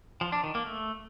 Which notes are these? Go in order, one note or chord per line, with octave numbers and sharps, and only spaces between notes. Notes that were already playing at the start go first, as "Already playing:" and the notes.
F3
D4
D#3
A#3
A3